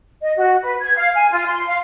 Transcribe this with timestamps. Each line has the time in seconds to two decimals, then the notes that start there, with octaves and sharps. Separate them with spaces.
0.21 D#5
0.36 F#4
0.63 B4
0.80 G#6
0.96 F5
1.14 G#5
1.31 F4
1.46 C6
1.68 F5